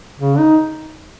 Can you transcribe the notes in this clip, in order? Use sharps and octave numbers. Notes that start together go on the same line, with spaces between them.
C#3
D#4